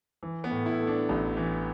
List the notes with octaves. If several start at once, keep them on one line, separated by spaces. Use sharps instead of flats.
E3
B3
A2
E4
A3
D4
A1
E3